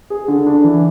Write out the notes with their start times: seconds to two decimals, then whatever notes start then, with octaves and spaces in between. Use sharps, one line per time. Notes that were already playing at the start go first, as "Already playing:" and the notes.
0.10 G#4
0.28 D3
0.47 D4
0.64 E3